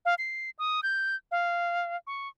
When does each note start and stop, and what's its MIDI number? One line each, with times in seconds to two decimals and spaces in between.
0.05 0.15 77
0.18 0.50 96
0.59 0.80 87
0.83 1.16 91
1.31 1.96 77
2.07 2.28 85